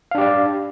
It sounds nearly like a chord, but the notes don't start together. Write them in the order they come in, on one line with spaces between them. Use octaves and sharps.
F5 D4 G4 D5